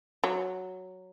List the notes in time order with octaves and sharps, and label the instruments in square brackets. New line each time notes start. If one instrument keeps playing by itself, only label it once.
[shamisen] F#3